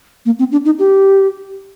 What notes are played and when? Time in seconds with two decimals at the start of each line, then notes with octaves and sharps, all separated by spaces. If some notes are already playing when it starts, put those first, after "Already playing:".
0.26 A#3
0.39 C4
0.52 D4
0.65 D#4
0.79 G4